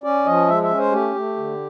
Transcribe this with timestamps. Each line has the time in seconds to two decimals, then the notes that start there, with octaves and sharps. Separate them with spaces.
0.03 C#4 D5
0.26 F3 D#5
0.48 G#3 E5
0.63 E5
0.70 C#4
0.78 C5
0.92 A3 G4
1.15 A3
1.37 D3